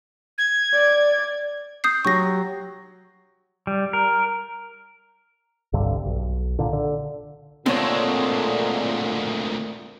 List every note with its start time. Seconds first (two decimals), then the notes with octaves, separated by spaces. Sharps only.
0.38 G#6
0.74 D5
1.84 D#6 G6 C7
2.05 F#3 G4 C#6 A#6
3.67 G3
3.93 A#4
5.73 G1 C2 G2 D3
6.06 B1
6.59 A#2 D3
6.73 D3
7.66 D2 A#2 D3 G#3 A3 C4 C#5